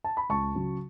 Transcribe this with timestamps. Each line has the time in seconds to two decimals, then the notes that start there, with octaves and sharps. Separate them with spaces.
0.04 A5
0.17 B5
0.29 C#2 A5 C#6
0.55 C#3 F#3